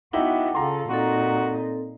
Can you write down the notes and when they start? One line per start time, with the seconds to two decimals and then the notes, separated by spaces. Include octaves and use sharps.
0.13 B3 D#4 E4 F#4 E5 F#5 G5 D6
0.55 C#3 F4 A4 A#5 C6
0.89 A#2 C4 D#4 F#4 A4